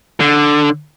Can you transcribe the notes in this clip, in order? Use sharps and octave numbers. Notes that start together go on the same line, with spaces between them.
D3